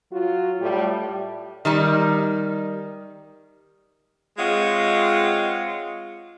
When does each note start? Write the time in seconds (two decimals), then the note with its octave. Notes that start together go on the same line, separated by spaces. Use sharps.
0.12 F#3 F4 F#4
0.59 A2 G3
1.65 D#3 G3 D#4
4.38 G#3 C4 F4 C#5 D#5 F#5